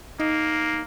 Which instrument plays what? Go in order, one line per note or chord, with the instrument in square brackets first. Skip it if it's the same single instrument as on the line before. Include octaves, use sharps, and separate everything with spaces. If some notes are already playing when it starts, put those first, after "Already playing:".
[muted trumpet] A#3 [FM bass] D#4